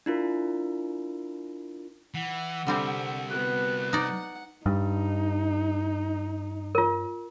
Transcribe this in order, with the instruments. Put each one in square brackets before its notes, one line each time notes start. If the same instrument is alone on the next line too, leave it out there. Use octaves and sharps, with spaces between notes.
[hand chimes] D4 E4 F4 A#4
[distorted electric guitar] E3 [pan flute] F#5
[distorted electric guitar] C2 [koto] D3 G3 C4 [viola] E5
[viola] B3 F#4 [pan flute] F#6
[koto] D#4 D5 [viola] F#5
[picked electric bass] G2 [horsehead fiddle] D#4
[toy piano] F4 A#4